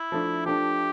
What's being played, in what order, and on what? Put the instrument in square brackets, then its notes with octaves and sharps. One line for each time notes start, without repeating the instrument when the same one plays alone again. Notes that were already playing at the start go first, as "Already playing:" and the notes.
Already playing: [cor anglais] E4
[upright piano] F3 A3 D4
[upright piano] F3 A3 D4 [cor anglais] G4